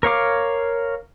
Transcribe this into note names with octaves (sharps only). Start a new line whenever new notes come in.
A#4 C#5 F5 D6